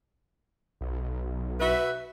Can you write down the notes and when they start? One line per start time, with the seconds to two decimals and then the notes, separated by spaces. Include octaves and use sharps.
0.81 B1
1.60 F#4 B4 E5